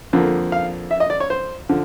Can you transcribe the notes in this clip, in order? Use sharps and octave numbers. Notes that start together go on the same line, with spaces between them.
F2 D3 F3 A#3
F5
E5
D#5
D5
C#5
C5
D3 F3